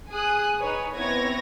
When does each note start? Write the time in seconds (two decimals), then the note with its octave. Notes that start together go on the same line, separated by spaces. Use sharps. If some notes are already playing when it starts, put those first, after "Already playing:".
0.11 G#4 G#5 D#6 F#6
0.59 D#4 B4 C#5
0.94 B3 C4 E4 C#5 G#6 A#6